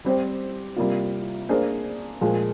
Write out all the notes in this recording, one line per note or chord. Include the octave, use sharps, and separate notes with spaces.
G3 C4 G4 C5
C3 G3 A#3 F4
A#3 D4 G#4 C5
A#2 F3 G#3